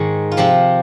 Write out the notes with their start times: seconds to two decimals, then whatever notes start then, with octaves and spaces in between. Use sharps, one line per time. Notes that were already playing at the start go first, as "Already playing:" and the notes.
Already playing: G#2 D#3 G#3
0.32 F4
0.37 C3 F3 C4 G4